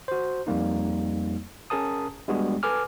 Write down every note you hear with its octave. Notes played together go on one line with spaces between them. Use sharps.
F#4 C5
F2 G3 A#3 D#4
C#4 G#4 A#4 A5 D#6
G3 G#3 B3 D4 F#4 G#4
A4 B4 G#5 D6 F6